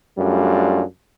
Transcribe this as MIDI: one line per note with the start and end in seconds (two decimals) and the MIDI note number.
0.18 0.81 42
0.18 0.81 55
0.18 0.81 57
0.18 0.81 62
0.18 0.81 65